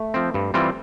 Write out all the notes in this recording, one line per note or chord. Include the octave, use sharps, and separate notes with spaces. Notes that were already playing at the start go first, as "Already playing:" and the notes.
Already playing: A3
F3 C4
G2
E3 G3 C4 F4